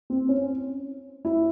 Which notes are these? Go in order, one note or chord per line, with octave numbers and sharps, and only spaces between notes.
C4
C#4
E4